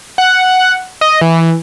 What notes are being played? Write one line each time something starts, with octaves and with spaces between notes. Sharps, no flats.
F#5
D#5
E3